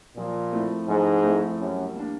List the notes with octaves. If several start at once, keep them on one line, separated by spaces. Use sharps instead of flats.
A#2 F3
A3 C4 E4 A4
G#2 F3
A3 C4 E4 A4
F#2 G3
A#3 D4